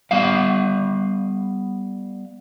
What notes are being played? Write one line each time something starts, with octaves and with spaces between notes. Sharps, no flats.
G3 B3 F5